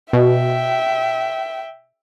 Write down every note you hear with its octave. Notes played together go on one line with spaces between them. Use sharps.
B2 E5 G5